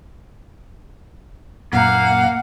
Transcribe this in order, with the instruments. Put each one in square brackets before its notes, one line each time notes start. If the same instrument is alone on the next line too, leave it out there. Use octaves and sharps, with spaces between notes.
[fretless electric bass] F#2 A#2 [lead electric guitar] A#3 A#5 [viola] F5 [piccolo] F#5